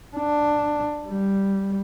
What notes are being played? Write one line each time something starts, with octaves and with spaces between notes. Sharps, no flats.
D4
G3